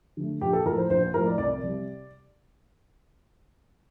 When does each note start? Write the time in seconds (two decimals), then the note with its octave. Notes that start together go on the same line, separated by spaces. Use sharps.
0.17 D3 A3
0.41 A#1 G4
0.53 A4
0.66 A2 F3 A3 A#4
0.78 C5
0.90 A#1 C5
1.03 C5
1.14 A2 F3 A3 A#4
1.26 D5
1.38 C2 D5
1.63 C3 G3